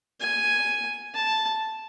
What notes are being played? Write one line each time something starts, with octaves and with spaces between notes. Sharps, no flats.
G#5
A5